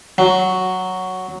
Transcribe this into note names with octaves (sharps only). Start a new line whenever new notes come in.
F#3